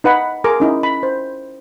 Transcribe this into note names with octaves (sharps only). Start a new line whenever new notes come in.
D#4 B4 F#5 B5
G#4 A#4 C6 D6
C#4 D#4 E4
B5
C5